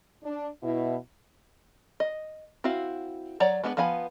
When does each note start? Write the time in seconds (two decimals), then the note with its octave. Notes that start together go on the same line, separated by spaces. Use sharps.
0.24 D4
0.63 B2 E4
2.00 D#5
2.64 C4 E4 F#4 F5
3.40 F#3 C#5 D5 A#5
3.63 G#3 B3 D4 A4 B4
3.77 F3 B3 F5 G#5 B5